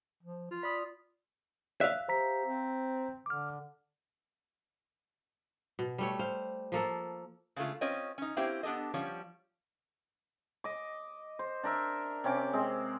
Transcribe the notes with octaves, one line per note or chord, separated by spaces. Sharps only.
F3
F4
D5 B5 D#6
E5 F5 F#6
G4 C5 A#5 B6
C4
D3 D6 F6
B2
G3 A3 C#5
C5 F5
F3 A#3 A4
C#3 G#3 A3 F4
C4 C#4 F4 C#5 D#5
C#4 D#4
A#3 C4 C#4 E4 G4 C5
B3 D4 G4 A4 D#5
F3 G3 C#4 C#5
D#5 D6
C5
D4 A#4 E5
C3 C#4 G4 D6
G#3 C4